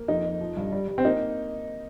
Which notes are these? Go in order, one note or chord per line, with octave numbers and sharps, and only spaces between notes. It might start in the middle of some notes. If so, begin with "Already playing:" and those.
Already playing: A#3
F2 D#4
F2
F3
G2
G3
G3
C4
A#3 D#4